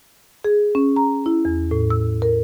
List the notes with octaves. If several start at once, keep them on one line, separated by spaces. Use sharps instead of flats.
G#4
C#4
A#5
E4
E2
A2
E6
A#4